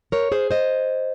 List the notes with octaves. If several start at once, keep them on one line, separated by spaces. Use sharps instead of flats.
A#4 C#5
G#4 C5
C5 D#5